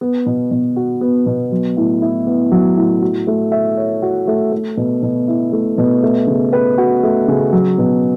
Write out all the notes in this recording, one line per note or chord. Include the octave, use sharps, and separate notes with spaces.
B3
B2
B2
F#4
B3
B2
F#3
A2
E4
B3
F#3
A2
F#4
A3
E5
C#5
F#4
A3
A3
B2
B2
E4
A3
B2
A3
C#3
B4
F#4
A3
C#3
F#3
B2